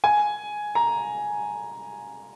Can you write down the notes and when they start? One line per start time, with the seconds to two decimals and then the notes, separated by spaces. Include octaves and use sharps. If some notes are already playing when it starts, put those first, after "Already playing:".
0.04 G#5
0.75 A#5